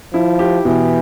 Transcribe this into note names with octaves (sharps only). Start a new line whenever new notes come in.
F3 E4
G4
B2 E3